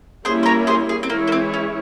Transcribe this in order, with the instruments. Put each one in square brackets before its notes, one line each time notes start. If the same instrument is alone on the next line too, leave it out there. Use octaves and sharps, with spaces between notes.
[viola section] G3 A#3 C#4 E4 [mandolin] G#4 C5
[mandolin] C5
A#4 C#5
G#4 C5
G#4
C4
[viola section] E3 G#3 E4 G#4 C#5 [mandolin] A#3
[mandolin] A#3
C4
C#4